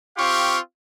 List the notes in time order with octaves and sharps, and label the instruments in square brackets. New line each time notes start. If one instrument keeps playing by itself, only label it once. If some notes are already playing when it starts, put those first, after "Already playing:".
[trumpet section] C4 F4 G4 F5 C#6